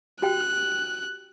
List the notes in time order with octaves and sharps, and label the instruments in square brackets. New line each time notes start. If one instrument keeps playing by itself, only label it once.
[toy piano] F#4 G4 G5 [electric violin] F#6